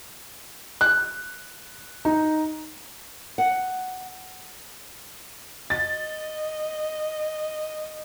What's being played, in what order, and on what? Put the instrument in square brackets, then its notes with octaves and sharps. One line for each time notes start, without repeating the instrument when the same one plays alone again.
[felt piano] F#6
D#4
[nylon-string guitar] F#5
[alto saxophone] D#5 [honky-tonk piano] A6